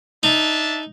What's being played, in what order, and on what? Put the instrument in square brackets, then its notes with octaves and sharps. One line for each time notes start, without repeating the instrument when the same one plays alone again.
[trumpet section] D4 E5 A5 [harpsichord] D#4